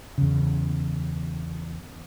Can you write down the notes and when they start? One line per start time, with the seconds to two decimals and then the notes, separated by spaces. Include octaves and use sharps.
0.18 E2 C#3